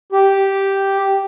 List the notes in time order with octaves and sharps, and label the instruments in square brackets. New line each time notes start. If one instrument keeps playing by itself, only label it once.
[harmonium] G4